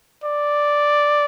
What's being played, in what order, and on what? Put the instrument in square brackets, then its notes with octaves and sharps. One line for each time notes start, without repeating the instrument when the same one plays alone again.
[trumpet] D5